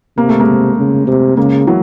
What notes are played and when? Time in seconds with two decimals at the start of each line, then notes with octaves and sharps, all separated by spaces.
0.17 C3 A#3
0.29 A3
0.40 G#3 A#3
0.78 C#3
1.07 C3
1.37 C#3 G#3 A#3
1.67 E3 F#3